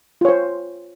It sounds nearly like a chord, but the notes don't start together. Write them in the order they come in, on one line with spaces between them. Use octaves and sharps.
F4 C#5 C5